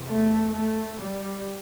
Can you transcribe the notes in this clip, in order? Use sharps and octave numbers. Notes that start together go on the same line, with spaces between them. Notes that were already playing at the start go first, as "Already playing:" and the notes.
Already playing: E2 C3
A3
A3
G3